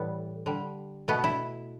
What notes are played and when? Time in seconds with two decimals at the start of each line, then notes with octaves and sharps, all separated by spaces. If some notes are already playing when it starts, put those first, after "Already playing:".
Already playing: A2 E3 G3 B3
0.46 D3 G3
1.08 B2 A3 B3
1.24 E4